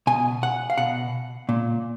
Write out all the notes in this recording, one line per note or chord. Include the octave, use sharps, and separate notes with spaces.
B2 G#5
F#5
F5
B2 F#5
A#2